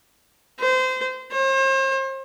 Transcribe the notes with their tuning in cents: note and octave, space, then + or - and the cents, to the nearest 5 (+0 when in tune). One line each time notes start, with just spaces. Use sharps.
C5 -25
C5 +40